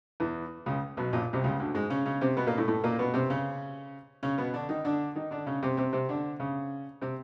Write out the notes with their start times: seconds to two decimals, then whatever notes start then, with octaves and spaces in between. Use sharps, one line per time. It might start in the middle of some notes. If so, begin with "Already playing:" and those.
0.20 E2 E3
0.66 C#2 C#3
0.97 B1 B2
1.13 A#1 A#2
1.33 C2 C3
1.44 C#2 C#3
1.60 D2 D3
1.74 G#2 G#3
1.90 C#3 C#4
2.06 C#3 C#4
2.21 C3 C4
2.37 B2 B3
2.47 A#2 A#3
2.57 A2 A3
2.68 A2 A3
2.84 A#2 A#3
2.99 B2 B3
3.14 C3 C4
3.30 C#3 C#4
4.23 C#3 C#4
4.38 B2 B3
4.54 D3 D4
4.69 D#3 D#4
4.85 D3 D4
5.16 D#3 D#4
5.31 D3 D4
5.46 C#3 C#4
5.63 C3 C4
5.77 C3 C4
5.93 C3 C4
6.09 D3 D4
6.40 C#3 C#4
7.02 C3 C4